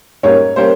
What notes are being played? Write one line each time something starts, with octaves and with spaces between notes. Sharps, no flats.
G#2 G3 A#3 C#4 C#5
G3 A#3 C#4 C5